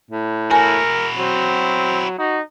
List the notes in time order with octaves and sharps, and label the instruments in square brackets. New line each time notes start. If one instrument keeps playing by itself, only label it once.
[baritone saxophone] A2
[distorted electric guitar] E4 F#4 [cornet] A#4 [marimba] G#5
[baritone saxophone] F#3 [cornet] C4
[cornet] D#4 [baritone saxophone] F#4